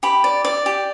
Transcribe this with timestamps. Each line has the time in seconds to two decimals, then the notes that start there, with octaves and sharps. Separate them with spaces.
0.03 G4 B5
0.24 D5
0.45 D5
0.66 G4